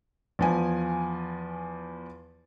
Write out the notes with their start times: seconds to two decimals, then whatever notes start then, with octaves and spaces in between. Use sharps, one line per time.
0.39 E2 F3 G#5